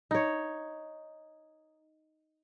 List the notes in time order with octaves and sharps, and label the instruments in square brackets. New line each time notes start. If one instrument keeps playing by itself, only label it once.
[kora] D#4 C#5